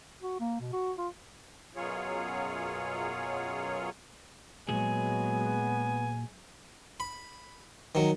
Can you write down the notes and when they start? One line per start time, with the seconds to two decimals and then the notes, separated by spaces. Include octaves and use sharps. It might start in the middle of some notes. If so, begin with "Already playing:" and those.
0.22 F#4
0.40 A#3
0.60 B2
0.73 F#4
0.98 F4
1.76 F#2 B2 F#3 F4 G#4 C#5
4.69 A#2 F#3 G#3 B3 F#4 G#4 G#5
7.00 B5
7.95 D#3 F#3